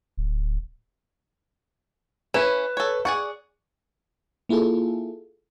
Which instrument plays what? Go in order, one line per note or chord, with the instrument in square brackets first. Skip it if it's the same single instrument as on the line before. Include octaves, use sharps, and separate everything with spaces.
[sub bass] D1
[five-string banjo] C#4 E4 [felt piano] B4 E7
[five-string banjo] A4 C#5
[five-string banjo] G#4 D5 F#5 [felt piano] C#6
[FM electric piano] A#3 E4 F4 G#4 A4